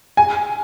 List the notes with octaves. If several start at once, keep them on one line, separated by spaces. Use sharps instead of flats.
G#5